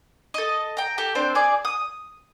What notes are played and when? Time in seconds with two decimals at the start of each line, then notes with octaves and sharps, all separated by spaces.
0.34 A4 D#5
0.77 G5 A#5
0.98 G4 A4
1.15 C4 D4 C5
1.35 G#4 D5
1.65 D#6